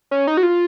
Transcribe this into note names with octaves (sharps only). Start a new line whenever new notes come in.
C#4
D#4
F#4
F4